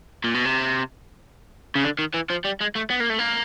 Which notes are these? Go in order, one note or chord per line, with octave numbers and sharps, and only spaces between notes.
A#2
B2
C3
C#3
D3
D#3
E3
F3
G3
G#3
A3
B3
A#3
A3
A#3